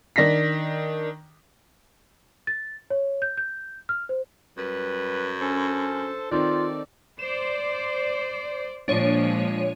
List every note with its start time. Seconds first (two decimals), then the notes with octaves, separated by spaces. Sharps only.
0.16 D#3 D4 A#6 B6
2.47 A6
2.90 C#5
3.22 G6
3.37 G6
3.89 F6
4.09 C5
4.57 F#2 G3 B4
5.40 C#4 D4 A4 C5
6.32 D#3 C4 D#4 F4 A4 D5
7.19 C5 D5 E7
8.88 A#2 F3 G#3 D4 C#5 D#7